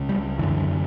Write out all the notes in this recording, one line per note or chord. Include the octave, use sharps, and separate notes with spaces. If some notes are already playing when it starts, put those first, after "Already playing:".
Already playing: C#2 C#3
G3
F#2 D3 E3